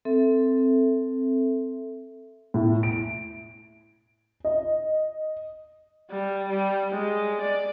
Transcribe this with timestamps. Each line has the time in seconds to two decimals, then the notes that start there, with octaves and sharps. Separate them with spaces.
0.05 C4 A4 E5
2.54 A2
2.83 D7
4.45 D#5
6.11 G3
6.49 G3
6.92 G#3
7.41 D5